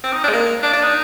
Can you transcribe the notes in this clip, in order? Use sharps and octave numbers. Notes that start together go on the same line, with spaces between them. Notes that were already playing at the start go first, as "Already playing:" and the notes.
C4
D#4
D4
G#3
A#3
D4
D4
D#4